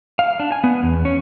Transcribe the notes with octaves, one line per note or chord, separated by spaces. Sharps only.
F5
D4
G#5
B3
E2
C#4